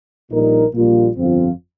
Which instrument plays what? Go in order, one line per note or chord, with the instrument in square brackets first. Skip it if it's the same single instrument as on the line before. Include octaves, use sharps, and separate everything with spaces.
[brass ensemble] A#1 A#2 G3 D#4 A#4
A#1 A#2 G3 A#3 F4
G1 F2 F3 C4 F4